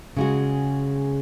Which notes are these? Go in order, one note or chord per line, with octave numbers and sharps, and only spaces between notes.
C#3 G#3 F#4